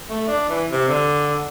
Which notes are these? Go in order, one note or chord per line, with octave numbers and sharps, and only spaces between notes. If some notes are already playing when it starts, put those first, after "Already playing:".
A3
D4
E3
C3
D3